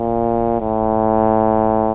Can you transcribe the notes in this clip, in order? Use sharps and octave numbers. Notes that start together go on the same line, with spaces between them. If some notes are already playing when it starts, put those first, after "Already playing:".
Already playing: A#2
A2